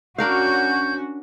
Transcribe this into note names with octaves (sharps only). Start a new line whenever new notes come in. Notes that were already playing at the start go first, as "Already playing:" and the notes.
C#4 D4 F#4 A#4 F5 G6